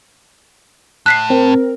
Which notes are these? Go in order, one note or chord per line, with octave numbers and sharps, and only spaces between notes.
A2 F#6 B6 C7
C4 A#4